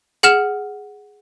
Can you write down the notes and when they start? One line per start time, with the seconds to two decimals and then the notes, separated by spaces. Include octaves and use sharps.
0.23 G#4 F#5 F6 E7